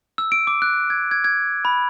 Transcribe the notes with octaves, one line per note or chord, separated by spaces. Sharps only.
E6
D7
D6
F#6
G#6
G#6
G#6
B5